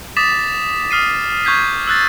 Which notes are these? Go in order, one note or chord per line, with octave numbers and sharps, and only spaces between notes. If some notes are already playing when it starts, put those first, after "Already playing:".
D6 D#6 A6 B6 E7
D#6 F6 C7 D#7
C#6 G6 G#6 B6
E6 F#6 A6